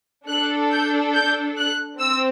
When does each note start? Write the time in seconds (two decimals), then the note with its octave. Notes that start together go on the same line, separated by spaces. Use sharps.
0.28 D4 A4 F#6
0.70 G6
1.14 G6
1.57 F#6
1.99 C4 E6